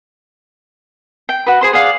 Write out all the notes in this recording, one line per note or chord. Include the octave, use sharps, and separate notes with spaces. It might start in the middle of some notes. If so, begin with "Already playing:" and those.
G5
F#4 B4
G#4 C5 C6
G#4 D5 F5 F#5